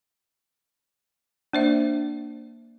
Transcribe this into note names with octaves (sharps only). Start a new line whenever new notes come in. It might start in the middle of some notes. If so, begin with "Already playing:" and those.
A#3 D4 C5 E5